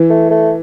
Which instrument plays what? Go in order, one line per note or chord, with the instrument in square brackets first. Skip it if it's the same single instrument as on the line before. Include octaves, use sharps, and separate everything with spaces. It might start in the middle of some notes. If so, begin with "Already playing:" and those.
Already playing: [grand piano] E3
[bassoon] A3
A3